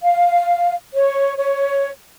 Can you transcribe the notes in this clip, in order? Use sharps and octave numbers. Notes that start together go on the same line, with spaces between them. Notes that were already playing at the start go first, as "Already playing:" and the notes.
F5
C#5
C#5